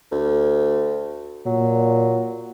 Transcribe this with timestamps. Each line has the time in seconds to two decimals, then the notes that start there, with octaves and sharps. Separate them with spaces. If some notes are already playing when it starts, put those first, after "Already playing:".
0.12 D2
1.46 A#2 F#3